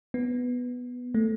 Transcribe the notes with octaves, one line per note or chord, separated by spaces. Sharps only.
B3
A3